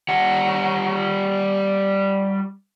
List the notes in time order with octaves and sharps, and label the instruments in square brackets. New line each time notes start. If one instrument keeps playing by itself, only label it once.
[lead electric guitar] G3 F#5